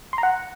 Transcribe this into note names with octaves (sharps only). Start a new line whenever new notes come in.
C6
A#5
F#5